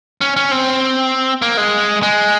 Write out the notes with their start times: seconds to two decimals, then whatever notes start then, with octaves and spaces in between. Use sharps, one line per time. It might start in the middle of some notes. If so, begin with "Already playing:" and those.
0.21 C#4
0.36 C#4
0.51 C4
1.42 A#3
1.57 G#3
2.03 G#3